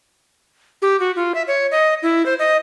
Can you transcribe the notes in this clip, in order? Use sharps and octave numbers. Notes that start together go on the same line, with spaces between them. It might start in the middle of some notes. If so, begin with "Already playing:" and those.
G4
F#4
F4
E5
C#5
D#5
E4
C5
D#5